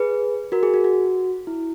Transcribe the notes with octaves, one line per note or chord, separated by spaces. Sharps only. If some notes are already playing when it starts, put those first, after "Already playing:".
Already playing: G#4 B4
F#4 A#4
G#4
F#4
F#4
E4